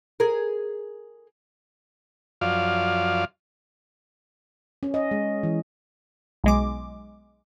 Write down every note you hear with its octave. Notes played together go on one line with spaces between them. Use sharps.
G#4 A#4
F#2 F3 D5 F5
C#4
D#5
G#3
E3
B1 G#3 D6